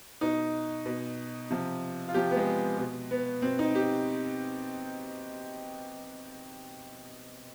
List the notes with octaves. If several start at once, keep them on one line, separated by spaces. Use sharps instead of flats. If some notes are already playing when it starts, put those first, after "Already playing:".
B2 D#4
B2
C3 F3
F4
C3 F3 G4
B3
G#3
B2
B3
B2 C4
D#4
G4